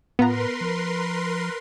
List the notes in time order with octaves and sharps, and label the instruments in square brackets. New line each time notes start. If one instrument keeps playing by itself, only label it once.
[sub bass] A2 [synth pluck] B3 F4 A#5 [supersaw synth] A#4 B4 C6
[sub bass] F3